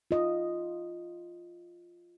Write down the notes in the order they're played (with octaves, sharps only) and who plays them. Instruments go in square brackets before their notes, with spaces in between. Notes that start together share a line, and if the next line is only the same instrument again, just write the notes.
[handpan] F4 D#5